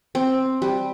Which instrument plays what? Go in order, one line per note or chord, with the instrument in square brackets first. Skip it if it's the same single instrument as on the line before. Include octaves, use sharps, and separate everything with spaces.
[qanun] C4
G3